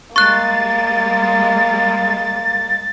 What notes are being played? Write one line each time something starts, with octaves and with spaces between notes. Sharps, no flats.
G3 G#3 A#3 C#6 F#6 A6